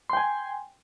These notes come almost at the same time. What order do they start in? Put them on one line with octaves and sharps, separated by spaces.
C6 G5 G#5